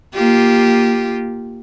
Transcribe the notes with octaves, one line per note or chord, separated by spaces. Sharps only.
A#3 F4 G4